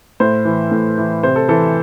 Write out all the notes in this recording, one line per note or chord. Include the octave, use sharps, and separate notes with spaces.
A2 C5
E3
A2
E3
C3 C5
A4
E3 A4